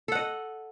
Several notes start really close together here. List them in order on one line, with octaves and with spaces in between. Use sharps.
A4 F#5 D#5